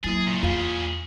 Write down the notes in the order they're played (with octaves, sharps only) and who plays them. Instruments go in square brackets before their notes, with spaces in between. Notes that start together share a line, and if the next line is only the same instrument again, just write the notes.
[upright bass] F#3 [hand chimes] A#3 E4 A6 [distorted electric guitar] G#4
[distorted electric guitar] A#2 C#3
[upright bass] E2 [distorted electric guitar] A#2 G#4 [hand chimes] F4 F5